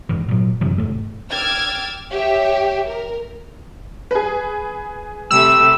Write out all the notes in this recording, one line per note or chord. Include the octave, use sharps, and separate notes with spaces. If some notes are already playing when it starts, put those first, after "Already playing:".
F1 G#2 E3
A#2 F#3
F#2 C3 E3 F#3
E1 G#2 A3
G5 D6 E6 F6 G#6 A6
G4 C#5 E5
A#4
G#4 B4
C3 G3 A3 E6